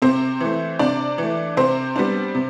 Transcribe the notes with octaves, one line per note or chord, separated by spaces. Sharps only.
C3 C4 C5
E3 A3
C3 D4 D5
E3 A3
C3 C4 C5
G3 B3 D4
C3